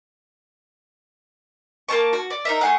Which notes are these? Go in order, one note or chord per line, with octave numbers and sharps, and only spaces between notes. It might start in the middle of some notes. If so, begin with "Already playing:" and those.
A#3 C#4 A5 C#6
F#4
D5
D#4 A#4 E5
A3 G#4 F#5